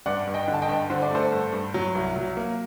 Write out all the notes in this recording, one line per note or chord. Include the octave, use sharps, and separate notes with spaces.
G2 D5 F#5
G2
D#5 G5
D3
A5
D#5 G5
G2
D3 C5
D5
A3 A4 C5
G2
G2
F#3
C2
F#3
A#3